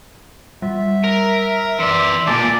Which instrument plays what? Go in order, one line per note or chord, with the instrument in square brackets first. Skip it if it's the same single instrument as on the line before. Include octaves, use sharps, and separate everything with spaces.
[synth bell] G3 [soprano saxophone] E5
[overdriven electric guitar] A#4
[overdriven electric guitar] E3 D5 [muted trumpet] E5 [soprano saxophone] C6
[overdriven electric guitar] D2 A#2 [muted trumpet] D5 [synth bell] G#5 A5 D6